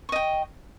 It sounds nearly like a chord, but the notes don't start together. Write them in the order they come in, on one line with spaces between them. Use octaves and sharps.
C#6 D#5 G5